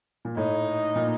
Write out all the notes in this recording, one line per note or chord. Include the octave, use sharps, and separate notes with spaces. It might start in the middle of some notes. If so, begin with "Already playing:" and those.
A#2
A2 D#4
A#2